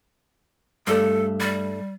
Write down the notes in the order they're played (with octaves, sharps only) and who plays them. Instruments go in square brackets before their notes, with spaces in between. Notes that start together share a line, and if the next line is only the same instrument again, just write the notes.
[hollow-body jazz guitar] G2 A3 [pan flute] A4
[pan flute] G3